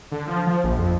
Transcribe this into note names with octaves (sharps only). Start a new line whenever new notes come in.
D3
F3
F3
A#1
F2